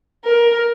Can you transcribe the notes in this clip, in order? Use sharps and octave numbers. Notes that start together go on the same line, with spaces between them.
A#4